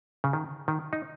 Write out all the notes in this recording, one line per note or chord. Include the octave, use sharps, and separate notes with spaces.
C#3
D#3
D#3
D#4